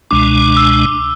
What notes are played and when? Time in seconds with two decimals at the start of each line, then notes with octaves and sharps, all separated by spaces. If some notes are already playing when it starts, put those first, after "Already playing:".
0.11 C#2 B2 G#3 D4 D6
0.57 E6